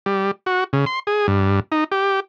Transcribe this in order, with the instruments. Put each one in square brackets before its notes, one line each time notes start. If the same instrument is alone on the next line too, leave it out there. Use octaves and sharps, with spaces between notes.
[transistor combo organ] G3
F#4
C#3
C6
G#4
G2
D#4
G4